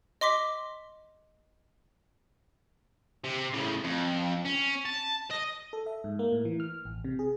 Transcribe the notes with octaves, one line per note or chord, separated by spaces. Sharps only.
D#5 C6 D6 B6
C3
A2 C#3
F2
C#4
A5
D#5
A4
E5
G#2
A#3
A2
E3
F6
A1
C3
G#4